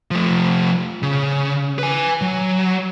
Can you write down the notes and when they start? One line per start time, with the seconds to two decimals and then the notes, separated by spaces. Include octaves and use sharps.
0.11 F3 A3
1.02 C#3
1.79 B4 G#5
2.21 F#3